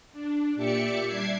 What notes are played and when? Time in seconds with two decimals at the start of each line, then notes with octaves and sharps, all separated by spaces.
0.12 D4
0.55 A#2 G4 D5 E5 D6 C#7
1.06 G3 D4 E5 D6 G#6 C7